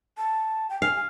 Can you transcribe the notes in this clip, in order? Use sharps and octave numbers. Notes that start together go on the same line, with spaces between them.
A5
G5
F5 G#5
G#5